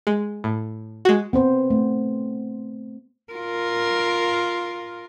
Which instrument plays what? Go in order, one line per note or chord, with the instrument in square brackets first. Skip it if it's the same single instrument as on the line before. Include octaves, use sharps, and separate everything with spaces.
[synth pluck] G#3
A2
G#3 F#4
[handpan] B3 C4 C5
A3
[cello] F4 A#4